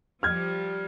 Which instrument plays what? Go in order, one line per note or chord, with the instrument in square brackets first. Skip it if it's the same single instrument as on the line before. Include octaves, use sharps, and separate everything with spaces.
[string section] F3 G3 [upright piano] F6 G#6